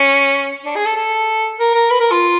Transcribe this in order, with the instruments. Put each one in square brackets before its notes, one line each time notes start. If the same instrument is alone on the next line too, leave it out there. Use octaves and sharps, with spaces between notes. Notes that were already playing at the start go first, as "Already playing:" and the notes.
Already playing: [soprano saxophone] C#4
D4
G#4
A4
A4
A#4
A#4
B4
A#4
F4